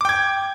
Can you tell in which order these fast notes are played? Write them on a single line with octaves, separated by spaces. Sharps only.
D6 G5 G#6